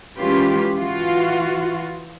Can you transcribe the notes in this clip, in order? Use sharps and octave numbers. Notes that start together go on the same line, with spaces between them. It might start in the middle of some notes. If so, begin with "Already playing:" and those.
E3 G#3 C#4 F4 G4 B4
E3 F4 F#4